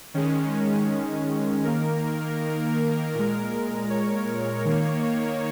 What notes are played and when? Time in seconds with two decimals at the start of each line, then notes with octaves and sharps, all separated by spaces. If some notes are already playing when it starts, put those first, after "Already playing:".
0.14 D#3 G#3 C#4
1.64 D#3 A#3 A#4
3.14 A#2 G#3 A#4
3.90 C#5
4.65 D#3 A#3